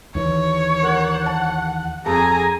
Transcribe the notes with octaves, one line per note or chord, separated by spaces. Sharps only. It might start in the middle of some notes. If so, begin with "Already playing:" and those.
D#2 E3 C#5
A#4 F#5
A5
F2 G#4 A4 G#5 A#5